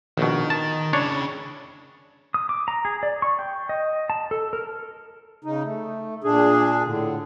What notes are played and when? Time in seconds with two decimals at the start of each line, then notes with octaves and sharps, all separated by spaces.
0.18 A#1 B2 D#3
0.50 A5
0.93 C#3 D4 E4 C#5
2.34 D#6
2.49 D6
2.68 A#5
2.85 G#4
3.03 D5
3.22 C#6
3.39 G5
3.69 D#5
4.10 A5
4.31 A4
4.53 A#4
5.44 C#3 D#4
5.63 A3
6.24 A#2 D4 G#4
6.85 A2 D3